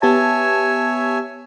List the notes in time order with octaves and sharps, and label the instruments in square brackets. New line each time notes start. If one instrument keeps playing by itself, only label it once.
[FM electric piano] B3 G4 A5 [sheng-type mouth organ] C#5 E5 G#5